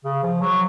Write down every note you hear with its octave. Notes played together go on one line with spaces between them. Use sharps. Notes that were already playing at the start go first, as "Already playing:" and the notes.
C#3
F3
F#3